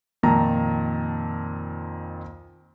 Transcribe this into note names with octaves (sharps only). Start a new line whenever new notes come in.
F2 A#2 D#3 A5 A#5